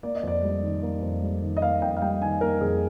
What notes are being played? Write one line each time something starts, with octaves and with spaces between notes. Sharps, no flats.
A#3 D5
D#5
F2 D5
G3
D#3
A#3
F2
G3
D#3
D#5
A#3 F5
F2 G5
F5
G3 G5
D#3 G#5
A#3 A#4
F2 G#4